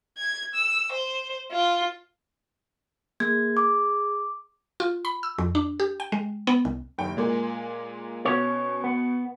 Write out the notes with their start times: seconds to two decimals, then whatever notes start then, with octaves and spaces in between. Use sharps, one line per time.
0.17 G#6
0.54 E6
0.92 C5
1.51 F4
3.20 A#3 G#4 G#6
3.57 D6
4.80 F4
5.05 B5
5.23 E6
5.38 F2
5.55 D4
5.80 G4
6.00 G5
6.12 G#3
6.47 B3
6.65 C2
6.98 F#1 D#2 G5
7.17 A#2 G#3 A#3
8.25 B2 C#4 C#5
8.84 B3